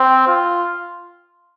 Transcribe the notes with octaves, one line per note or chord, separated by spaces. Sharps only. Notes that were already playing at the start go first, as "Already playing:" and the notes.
Already playing: C4
F4